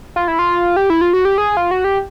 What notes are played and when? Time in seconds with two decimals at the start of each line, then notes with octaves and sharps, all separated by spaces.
0.16 F4
0.28 E4
0.39 F4
0.76 G4
0.90 E4
1.01 F4
1.13 F#4
1.25 G4
1.38 G#4
1.57 F4
1.71 F#4
1.84 G4